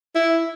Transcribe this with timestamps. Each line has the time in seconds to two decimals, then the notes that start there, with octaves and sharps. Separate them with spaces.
0.15 E4